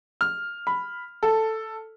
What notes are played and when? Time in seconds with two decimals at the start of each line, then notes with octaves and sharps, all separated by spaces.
0.21 F6
0.67 B5
1.23 A4